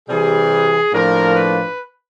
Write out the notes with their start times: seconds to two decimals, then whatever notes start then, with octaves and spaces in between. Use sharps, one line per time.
0.09 C3 E3 G3 G#4
0.93 A2 F3 A#3 D4 A#4
1.35 B4